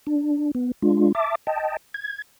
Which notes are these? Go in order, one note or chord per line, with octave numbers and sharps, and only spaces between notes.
D4
B3
G#3 D4 F4
E5 A5 D6
D#5 G5 A5
G#6